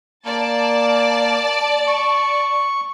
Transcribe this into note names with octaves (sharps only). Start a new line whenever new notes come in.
A#3 D5 A5
C#6